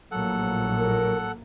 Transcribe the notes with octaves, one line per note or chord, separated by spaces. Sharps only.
A#1 A2 F#3 A#3 A4 F#5
A#4